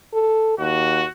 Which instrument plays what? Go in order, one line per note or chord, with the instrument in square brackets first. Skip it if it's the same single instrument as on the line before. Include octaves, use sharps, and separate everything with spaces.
[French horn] A4
[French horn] D#2 [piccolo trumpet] F#4